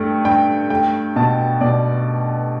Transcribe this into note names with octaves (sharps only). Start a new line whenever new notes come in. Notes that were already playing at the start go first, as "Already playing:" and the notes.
Already playing: G2 A3 G5
G2 G5
A3 G5
B2 A5
B2 D5